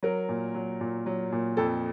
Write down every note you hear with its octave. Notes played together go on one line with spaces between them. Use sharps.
F#3 A#4
A#2
F#3
A#2
F#3
A#2
F2 A4